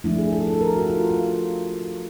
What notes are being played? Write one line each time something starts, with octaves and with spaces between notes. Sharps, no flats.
F3 A3 D4 E4
G#4
A4
A4
A#4
F#4
F4
F4